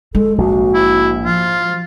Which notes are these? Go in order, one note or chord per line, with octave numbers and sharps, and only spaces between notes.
G#3 A4
A#1 G#2 F#4
E4
F3 F4